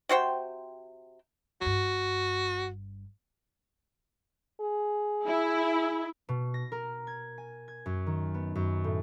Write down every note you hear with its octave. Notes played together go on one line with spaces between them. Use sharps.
C3 F#4 C5 G5
G1 G2 F#4
G#4
E4
B2
A#6
A#4
G#6
G#5
G#6
F#2
D#3
B3
F#2
A2